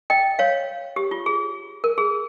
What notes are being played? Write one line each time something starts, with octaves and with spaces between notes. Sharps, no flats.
D#5 G5
C#5 F5
G4
F4
G#4
A#4
G#4